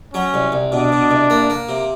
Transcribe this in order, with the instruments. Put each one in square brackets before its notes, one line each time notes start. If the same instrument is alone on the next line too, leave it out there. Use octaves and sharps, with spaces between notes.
[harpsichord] F#3 [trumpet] C#4
[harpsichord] C2
C2
[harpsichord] B2 [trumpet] D4
[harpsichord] B2
C2
A#3
A#3
C3